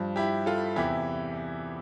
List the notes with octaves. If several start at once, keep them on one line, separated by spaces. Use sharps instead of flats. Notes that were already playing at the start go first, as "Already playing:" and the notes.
Already playing: G2 F3
E4 G4
F4 A4
E2 C3 E3 E4 G4